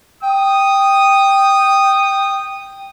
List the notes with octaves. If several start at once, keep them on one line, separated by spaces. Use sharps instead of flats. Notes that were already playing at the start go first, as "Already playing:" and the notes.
G5 D#6